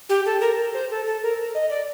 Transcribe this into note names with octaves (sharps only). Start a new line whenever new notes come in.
G4
A4
A#4
C5
A4
A4
A#4
D#5
D5